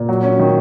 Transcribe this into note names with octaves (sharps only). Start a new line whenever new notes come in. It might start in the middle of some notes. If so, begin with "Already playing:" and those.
Already playing: A#2
F#3
C#4
D#3